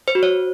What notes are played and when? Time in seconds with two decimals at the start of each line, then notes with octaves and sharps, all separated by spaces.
0.08 C5
0.15 F#4
0.23 C#5